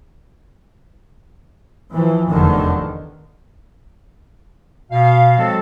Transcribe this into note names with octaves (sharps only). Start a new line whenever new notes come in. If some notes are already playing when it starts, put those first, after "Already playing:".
E3 F3
F1 E2 D3 D#3
B2 F5
F3 F#3 G#3 C4 F#4 A4